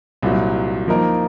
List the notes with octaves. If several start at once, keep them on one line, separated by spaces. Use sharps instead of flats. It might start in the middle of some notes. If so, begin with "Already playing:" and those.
C2 A#2 F#3
F3 A#3 D#4 A#4